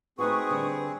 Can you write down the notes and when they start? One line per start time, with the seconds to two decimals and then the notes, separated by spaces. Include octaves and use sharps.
0.19 A3 C4 D#4 F#4 G#4 B4 C#6 D#6
0.51 D3 G3